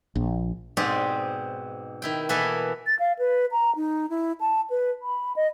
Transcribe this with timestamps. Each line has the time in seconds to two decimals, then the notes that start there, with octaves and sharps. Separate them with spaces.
0.15 A#1
0.77 G#2 B2 C4 G4 G#4 D5
2.02 D#3 E4 G5
2.29 B2 E3 A#3 E4 A4 B4
2.87 A6
3.00 F5
3.19 B4
3.52 A#5
3.76 D#4
4.10 E4
4.41 A5
4.70 B4
5.02 B5
5.36 D#5